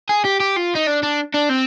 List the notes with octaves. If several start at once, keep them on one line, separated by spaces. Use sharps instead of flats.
G#4
G4
G4
F4
D#4
D4
D4
D4
C4